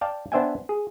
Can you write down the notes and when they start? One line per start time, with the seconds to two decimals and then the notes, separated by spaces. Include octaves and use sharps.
0.01 D5 F5 G5 A5
0.32 B3 D4 C5 E5 G5 G#5
0.69 G#4